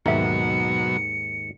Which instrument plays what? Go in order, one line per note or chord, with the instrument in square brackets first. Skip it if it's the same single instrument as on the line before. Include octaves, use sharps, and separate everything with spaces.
[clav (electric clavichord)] D#2 G#2 D#3 [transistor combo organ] B2 F#3 [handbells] D#4 E5 [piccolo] C#7